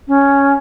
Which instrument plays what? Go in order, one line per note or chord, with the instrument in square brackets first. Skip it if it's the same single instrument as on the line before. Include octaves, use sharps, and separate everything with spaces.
[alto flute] C#4